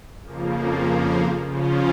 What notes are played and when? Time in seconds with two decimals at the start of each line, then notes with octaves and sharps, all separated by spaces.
0.23 F2 C#3 F3 A#3
1.46 C#3 F3 C#4 F4